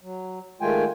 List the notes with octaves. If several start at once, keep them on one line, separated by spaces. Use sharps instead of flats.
F#3
D#3 G#3 A3 F4 G5 G#5